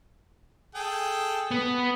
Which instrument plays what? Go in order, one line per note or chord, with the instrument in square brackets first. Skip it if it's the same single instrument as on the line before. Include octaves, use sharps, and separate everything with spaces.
[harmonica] G#4 A4 G5
[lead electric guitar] B3